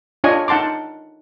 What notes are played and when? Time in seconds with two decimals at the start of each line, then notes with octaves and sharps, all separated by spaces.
0.24 D4 F4 C#5 D#5 G#5
0.48 D#4 F#5 A5 C6 D6